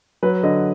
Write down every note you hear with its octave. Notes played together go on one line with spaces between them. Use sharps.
F#3 B4
D3 D#5